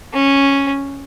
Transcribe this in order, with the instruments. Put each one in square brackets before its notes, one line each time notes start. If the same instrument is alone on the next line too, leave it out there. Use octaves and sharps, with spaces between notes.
[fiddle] C#4